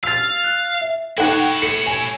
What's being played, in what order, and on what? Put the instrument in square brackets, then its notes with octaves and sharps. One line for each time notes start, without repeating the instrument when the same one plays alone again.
[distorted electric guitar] F5 [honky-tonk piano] E6 A6
[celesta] F#6
E5
[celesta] D#4 A4 [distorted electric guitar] E4 C#5 [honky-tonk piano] F#5 G5
[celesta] A4 [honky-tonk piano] C#7
[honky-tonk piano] G#5